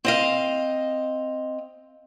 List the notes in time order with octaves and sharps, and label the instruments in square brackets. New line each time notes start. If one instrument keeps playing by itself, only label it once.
[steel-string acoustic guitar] C4 D#5 F5